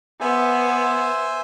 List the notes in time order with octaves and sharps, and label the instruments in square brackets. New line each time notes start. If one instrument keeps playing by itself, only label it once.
[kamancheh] B3 [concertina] C5 E5 G#5